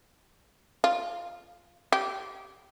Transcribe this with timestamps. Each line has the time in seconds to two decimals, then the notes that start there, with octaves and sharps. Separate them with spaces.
0.84 F4
1.92 G4